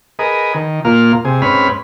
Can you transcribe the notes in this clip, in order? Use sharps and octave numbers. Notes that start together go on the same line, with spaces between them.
G#4 A#4 B4 D#5
D#3
A#2 A#3 F4 F6
C3 G#4
G#2 C4 C#4 B4 B5 F6